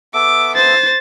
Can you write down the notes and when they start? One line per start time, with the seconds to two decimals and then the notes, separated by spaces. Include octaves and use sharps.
0.14 B3 A4 E5 D6
0.56 C5 A6